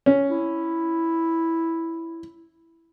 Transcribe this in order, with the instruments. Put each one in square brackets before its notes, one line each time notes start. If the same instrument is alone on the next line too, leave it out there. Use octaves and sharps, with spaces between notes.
[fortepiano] C#4
[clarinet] E4